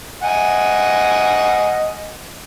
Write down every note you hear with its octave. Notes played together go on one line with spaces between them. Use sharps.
D#5 F#5 G#5